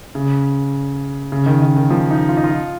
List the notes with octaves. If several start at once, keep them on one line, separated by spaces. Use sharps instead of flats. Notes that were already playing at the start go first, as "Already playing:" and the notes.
C#3
C#3
D#3
D#3
D#3
F3
D#4
F4
D#4
F4